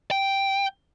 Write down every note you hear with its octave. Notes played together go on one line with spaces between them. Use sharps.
G5